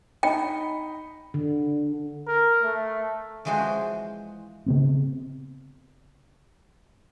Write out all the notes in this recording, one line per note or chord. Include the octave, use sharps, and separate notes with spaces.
D#4 D#5 G5 B5
D3
A#4
A3
E3 F3 G#3 F#4 G#4 C5
C#3 B3 C4